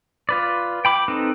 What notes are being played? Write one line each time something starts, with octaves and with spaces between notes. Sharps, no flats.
F4 B4 D5
G5 B5 D6
C4 D#4 A4 B4